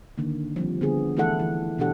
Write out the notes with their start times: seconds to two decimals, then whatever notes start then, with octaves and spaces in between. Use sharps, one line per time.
0.18 D3 D#3 A#3
0.56 F3 G3 C4
0.81 D3 B3 G#4
1.17 E3 A3 E4 A4 F#5
1.39 E3
1.78 B2 E3 D4 G4 A4 F#5